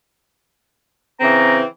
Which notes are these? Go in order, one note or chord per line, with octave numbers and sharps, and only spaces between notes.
C#3 E3 C4 A#5